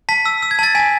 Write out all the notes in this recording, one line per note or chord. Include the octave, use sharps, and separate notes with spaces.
A5 B6
E6
E6
G#6
A5 A6
G#5 B6